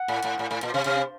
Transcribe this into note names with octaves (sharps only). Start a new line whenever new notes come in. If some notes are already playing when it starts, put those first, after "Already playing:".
Already playing: F#5
A2
A2
A2
A2
A#2
C3
C3 F5